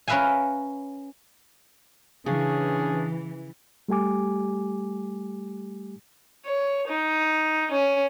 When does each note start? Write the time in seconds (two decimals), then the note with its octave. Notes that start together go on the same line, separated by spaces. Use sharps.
0.08 C#4 A#4 B4 E5 F5 G#5
2.26 C#3 E3 C#4 D4 G#4
3.88 G3 A3 G4 G#5 D6
6.46 C#5
6.89 D#4
7.72 C#4